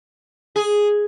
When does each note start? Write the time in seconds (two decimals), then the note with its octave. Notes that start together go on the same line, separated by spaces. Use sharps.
0.56 G#4